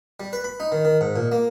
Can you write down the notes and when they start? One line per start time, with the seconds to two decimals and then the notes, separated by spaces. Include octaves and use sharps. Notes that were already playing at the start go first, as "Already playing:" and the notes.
0.20 G3
0.33 B4
0.44 B5
0.60 D#4
0.72 D#3
0.85 D#3
1.01 G#2
1.16 A#2
1.32 A#3